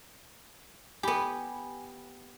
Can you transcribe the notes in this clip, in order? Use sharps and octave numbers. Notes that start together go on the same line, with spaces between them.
B3 G4 G#5 B5